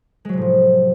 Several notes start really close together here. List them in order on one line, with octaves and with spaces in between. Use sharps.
G#3 F#3 C3 A2 F3